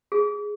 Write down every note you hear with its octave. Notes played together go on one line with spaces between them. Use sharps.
G#4